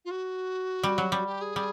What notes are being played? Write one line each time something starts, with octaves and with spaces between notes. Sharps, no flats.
F4
F#4
G3
F#3
G3
G4
G#4
G3